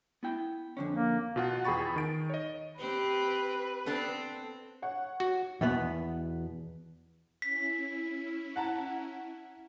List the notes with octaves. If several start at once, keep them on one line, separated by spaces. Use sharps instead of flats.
B3 E4 G5
F2 D3 C#4
A#3
B2 F4 F#5
E2 G#4 G5 B5 C#6 A6
D#3 D7
C#5 D#5
C4 G4 B4
B3 C4 D4 A4
C#5 F#5
F#4
E2 B2 B3
C#4 E4 B6
F#5 A5 A#5